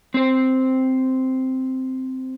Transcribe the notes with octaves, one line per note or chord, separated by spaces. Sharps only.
C4 C5